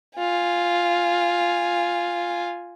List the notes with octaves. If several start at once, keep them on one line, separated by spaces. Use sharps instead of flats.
F4 G#5